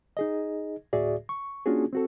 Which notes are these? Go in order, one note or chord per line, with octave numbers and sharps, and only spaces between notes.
D#4 G#4 D#5
D2 A2 F#4 G#4 D5 E5
C#6
A#3 C#4 D4 F4 F#4 G#4
C4 F#4 A4